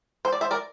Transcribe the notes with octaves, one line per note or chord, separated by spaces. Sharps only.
C5
D5
C5 E5
A#4 D5